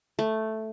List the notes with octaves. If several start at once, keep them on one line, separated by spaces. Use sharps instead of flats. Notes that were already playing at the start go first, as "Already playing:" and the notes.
A3